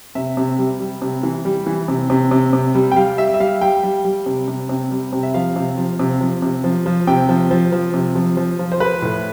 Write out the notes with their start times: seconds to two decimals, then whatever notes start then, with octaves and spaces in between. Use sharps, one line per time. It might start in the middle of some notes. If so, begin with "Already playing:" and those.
0.15 C3 E5
0.37 C3
0.59 G3
0.80 G3
1.02 C3
1.23 E3
1.45 G3
1.67 E3
1.88 C3
2.10 C3
2.31 C3
2.53 C3
2.75 G3
2.92 G5
2.96 G3 F5
3.18 G3 E5
3.34 E5
3.40 G3 F5
3.61 G3 G5
3.83 G3
4.05 G3
4.26 C3
4.48 C3
4.69 C3
4.91 G3
5.13 C3
5.23 E5
5.34 F3 F5
5.56 C3
5.78 F3
5.99 C3
6.21 F3
6.42 C3
6.64 F3
6.86 F3
7.07 C3 G5
7.29 F3
7.51 F3
7.72 F3
7.94 C3
8.16 F3
8.37 F3
8.59 F3
8.72 C5
8.80 F3 B4
9.02 A2